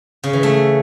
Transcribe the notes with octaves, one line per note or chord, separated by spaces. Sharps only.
C#3
E3
A3